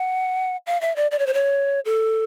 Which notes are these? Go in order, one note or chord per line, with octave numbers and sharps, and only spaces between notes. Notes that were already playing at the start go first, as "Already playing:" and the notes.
Already playing: F#5
F5
E5
D5
D5
C#5
C5
C#5
A4